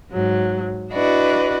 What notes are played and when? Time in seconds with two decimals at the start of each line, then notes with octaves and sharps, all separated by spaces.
0.10 G#2 F#3
0.92 D4 E4 F#4 B4 D5 D#5